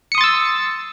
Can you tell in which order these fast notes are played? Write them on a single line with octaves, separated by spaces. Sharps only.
C#7 D#6 C6 A6 E6